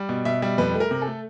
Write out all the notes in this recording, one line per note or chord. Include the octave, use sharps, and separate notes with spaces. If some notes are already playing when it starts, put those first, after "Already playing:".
Already playing: G3
B2
B2 E5
G3 E5
F2 B4
A3
A#4
C3
A4
A3